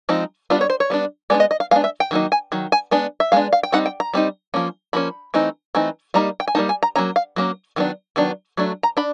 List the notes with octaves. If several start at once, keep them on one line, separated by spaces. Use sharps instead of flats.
F3 G#3 C4 D#4
G3 B3 D4 F4
C#5
C5
C#5
G3 B3 D4
G#3 B3 D4 D5
D#5
D#5
F5
G#3 B3 D4 F5
E5
G5
D#3 F#3 A#3 D#4
G#5
D#3 F#3
G#5
G#3 B3 D4
E5
G#3 B3 D4 F5
F5
G5
G3 C4 D#4 F#5
G5
A#5
G3 C4 D#4
F3 A#3 C#4
F3 A#3 C#4 B5
E3 A3 C4 D#4
E3 A3 C4 D#4
G3 A#3 D#4 A#5
G5
G#5
G3 A#3 D#4 A5
G#5
A#5
F#3 A#3 C#4 A#5
F5
F#3 A#3 C#4
D#3 F#3 B3 D4
D#3 F#3 B3 D4
F#3 A3 D4
A#5
D4 B5